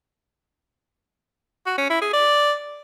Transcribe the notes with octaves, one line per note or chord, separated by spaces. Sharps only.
F#4
C#4
E4
G#4
D5